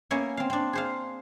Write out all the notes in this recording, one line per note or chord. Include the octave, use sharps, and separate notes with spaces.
A#3 B3 C#4 C#5 E5
C4 F5
C4 D4
G#4 C5 F5